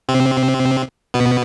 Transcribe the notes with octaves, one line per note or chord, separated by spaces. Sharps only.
C3 C4
B2 B3